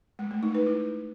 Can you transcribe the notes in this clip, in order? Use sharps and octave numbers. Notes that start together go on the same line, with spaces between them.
G#3
A3
D#4
B4
E4